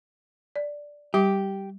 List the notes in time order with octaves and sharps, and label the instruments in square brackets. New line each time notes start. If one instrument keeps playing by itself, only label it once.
[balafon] D5
[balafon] G3 D6 [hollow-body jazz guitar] G4